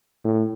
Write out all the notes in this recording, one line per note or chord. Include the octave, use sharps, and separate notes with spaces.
A2